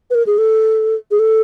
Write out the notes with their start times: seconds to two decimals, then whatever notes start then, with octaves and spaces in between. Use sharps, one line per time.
0.10 B4
0.15 A#4
0.27 G#4
0.38 A4
1.11 G#4
1.19 A4